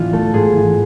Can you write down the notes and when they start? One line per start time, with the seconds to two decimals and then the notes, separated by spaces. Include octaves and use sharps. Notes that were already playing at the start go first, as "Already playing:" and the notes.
Already playing: A2 E3 B3 D4 F4
0.12 A3 A4
0.34 G#2 G#4
0.56 E3